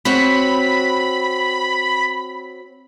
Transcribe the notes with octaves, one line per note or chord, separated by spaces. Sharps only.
C4 F#4 C#5 B5